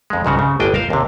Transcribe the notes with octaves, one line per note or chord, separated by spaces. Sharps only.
F2 G#3
C2 G#2 C#3 F#4
C#3 C4
G1 A2 A#3 D4 D#5 G5
A#4 C5 F5
D#2 C3